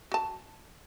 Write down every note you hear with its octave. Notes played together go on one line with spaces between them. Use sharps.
F#4 A5